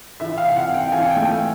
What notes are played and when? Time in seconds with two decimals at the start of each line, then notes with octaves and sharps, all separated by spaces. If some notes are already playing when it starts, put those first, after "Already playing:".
0.20 E3 E5
0.38 F5
0.44 C3
0.56 F#5
0.68 C2
0.74 G5
0.92 E3 G#5
1.10 G5
1.16 A3